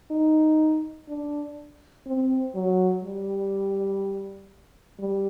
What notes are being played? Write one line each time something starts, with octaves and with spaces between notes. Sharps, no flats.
D#4
D4
C4
F#3
G3
G3